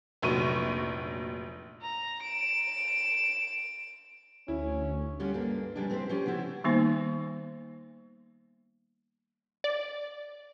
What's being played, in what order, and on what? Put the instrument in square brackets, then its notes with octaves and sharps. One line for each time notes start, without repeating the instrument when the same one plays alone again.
[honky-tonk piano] F1 A#1 F#3 C#6 D#7
[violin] A#5
D7 E7
[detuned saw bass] D2 [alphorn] C#4 [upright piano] E4
[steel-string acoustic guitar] D3 G3 C#4 F4
G2 A#3 D4
F2 C#3 G3 G#3 D4
E3 C4 A4 B4 C5
F3 C#4 G4
C#3 B3 C4 E4
[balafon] D#3 G3 A#3 B3 D#4 C5
[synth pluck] D5